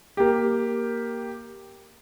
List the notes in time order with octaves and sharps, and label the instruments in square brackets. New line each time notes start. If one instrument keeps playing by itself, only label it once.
[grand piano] A#3 G4